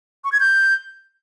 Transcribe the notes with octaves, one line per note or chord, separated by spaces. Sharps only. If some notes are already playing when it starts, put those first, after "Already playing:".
C#6
G#6
G6